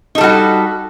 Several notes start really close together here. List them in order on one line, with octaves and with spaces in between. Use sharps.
D#4 A4 G3 F#4